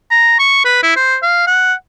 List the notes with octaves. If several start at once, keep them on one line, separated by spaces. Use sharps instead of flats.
A#5
C#6
B4
E4
C5
F5
F#5